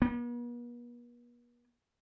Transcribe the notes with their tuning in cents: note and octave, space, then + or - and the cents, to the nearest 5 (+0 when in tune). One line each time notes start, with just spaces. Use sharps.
B3 -45